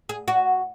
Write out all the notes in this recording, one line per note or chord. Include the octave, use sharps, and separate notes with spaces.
G#4
F#4